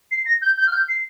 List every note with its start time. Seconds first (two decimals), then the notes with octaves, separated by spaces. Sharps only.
0.11 C7
0.25 A#6
0.42 G6
0.57 G6
0.67 F6
0.72 G6
0.88 C7